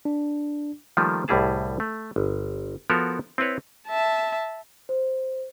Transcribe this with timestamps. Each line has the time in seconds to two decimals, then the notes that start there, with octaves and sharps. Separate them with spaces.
0.05 D4
0.97 D#3 F3 G3 A3 A#3
1.28 C2 A2 G3 E4 G#4 A5
1.80 A3
2.16 G1
2.90 F3 B3 F#4 A4 A#4
3.38 C4 E4 B4 C#5
3.88 E5 A5
4.89 C5